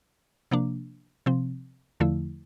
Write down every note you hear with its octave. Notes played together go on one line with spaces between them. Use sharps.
C3 F3 A#3 D4
C3 F3 C4
E2 D3 F3 A3 E4